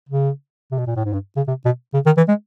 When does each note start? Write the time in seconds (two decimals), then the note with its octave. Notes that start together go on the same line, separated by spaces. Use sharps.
0.09 C#3
0.71 C3
0.78 B2
0.87 A#2
0.96 A2
1.05 G#2
1.13 G2
1.37 C#3
1.48 C3
1.65 B2
1.94 C#3
2.06 D#3
2.17 E3
2.29 G#3